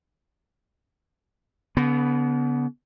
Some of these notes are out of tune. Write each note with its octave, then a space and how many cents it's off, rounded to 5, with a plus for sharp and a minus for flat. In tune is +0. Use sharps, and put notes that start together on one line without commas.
D3 -45 B3 +0